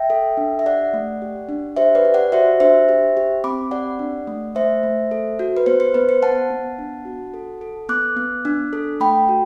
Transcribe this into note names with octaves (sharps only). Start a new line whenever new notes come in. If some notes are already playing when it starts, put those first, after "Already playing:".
Already playing: E5 G5
A4
D4
E5
G4 D5 F#5
A3
G4
D4
G4 C5 E5
B4 D5
G4
D5 F#5
F#4 C5 E5
D4 C5 E5
G4
G4
C4 B5 D6
G4 D5 F#5
D4
A3
A3 C5 E5
A3
A4
F#4
B4
B3 C5
C5
B3 B4
C5
B3 F#5 A5
B3
D4
F#4
A4
A4
B3 D6 F#6
B3
D4
A4
A3 G5 B5
F#4